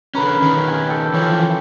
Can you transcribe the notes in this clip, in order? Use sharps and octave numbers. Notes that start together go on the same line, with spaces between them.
D3 C#4 A#4 B4
D#3 C#4
G#5
G4 A4
E3 F3 C#4